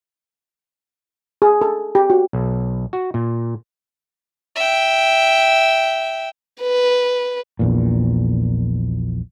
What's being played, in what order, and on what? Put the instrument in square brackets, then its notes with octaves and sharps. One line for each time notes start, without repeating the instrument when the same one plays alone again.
[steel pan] G#4
A4
G4
F#4
[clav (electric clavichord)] B1
F#4
A#2
[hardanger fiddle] E5 G5
[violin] B4
[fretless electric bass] A#1 E2 A#2